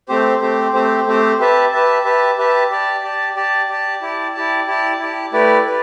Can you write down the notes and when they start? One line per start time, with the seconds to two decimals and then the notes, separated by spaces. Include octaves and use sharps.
0.08 A3 C4 G4 C5
0.41 A3 C4 G4 C5
0.74 A3 C4 G4 C5
1.07 A3 C4 G4 C5
1.39 G4 B4 E5 A5
1.72 G4 B4 E5 A5
2.04 G4 B4 E5 A5
2.38 G4 B4 E5 A5
2.70 G4 D5 A5
3.04 G4 D5 A5
3.36 G4 D5 A5
3.69 G4 D5 A5
4.02 E4 G4 D5 A5
4.34 E4 G4 D5 A5
4.67 E4 G4 D5 A5
4.99 E4 G4 D5 A5
5.32 A3 E4 G4 B4 D5
5.65 G4 B4 D5